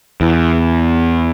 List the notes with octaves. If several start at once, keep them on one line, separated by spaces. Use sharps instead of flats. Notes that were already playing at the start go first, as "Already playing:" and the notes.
E2